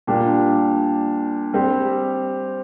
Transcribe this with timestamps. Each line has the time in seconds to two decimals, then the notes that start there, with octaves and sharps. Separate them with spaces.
0.07 A#2 G3 D4 G4
1.53 G3 C4 G4